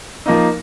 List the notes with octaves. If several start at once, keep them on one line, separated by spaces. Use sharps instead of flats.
F3 A#3 D#4